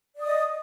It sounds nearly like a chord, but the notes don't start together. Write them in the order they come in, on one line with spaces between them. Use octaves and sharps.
D5 D#6 D#5